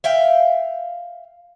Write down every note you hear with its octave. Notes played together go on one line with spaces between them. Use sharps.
E5 F5 G5